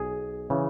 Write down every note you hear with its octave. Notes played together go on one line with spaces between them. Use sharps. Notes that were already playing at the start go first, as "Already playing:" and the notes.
Already playing: B1 G#4
C#3 E3